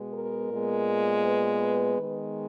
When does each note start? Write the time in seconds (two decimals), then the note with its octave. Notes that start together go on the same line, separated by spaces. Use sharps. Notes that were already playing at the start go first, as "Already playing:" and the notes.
Already playing: B2 G#3 B3
0.13 A#4
0.50 A#2 G#3 B3
1.24 B4
1.98 D#3 G#3 B3